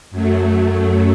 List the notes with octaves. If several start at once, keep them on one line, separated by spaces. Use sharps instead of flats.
F#2 F#3 A3